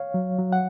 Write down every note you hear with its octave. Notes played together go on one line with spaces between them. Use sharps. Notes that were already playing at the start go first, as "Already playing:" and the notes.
Already playing: C#5 F5
F#3
F#3
F#5